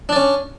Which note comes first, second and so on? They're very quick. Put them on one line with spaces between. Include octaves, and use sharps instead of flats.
D4 D5 C#4